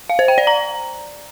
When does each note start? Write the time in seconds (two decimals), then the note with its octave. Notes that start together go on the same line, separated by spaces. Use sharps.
0.10 F5
0.19 C5
0.28 G5
0.38 D5
0.47 A#5